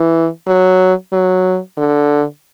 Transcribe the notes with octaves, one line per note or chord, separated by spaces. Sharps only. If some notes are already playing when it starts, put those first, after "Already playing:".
Already playing: E3
F#3
F#3
D3